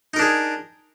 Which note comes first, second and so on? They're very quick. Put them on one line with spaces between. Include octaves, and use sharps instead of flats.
D#4 A#4 D4 G#4